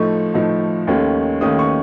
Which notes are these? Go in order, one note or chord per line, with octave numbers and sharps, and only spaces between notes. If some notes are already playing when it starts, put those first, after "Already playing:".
Already playing: A2 F3 A3 D#4 C#6
A2 F3 A3 D#4
D#2 D#3 A3 C#4
D#2 D#3 A3 C#4 D#6
C#6